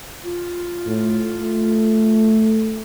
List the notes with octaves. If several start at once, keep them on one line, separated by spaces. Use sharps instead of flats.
F4
A2
A3